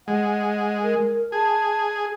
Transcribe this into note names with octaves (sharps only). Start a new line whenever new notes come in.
G#3 F#5
A#4
G#4 A5